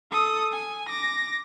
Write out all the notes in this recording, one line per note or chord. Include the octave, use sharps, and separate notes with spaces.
A4 D#6
G#5
D6 A#6